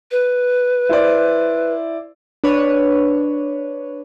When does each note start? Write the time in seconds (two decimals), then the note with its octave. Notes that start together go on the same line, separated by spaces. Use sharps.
0.11 B4
0.89 E4 C5 D5
2.44 D4 B4 C#5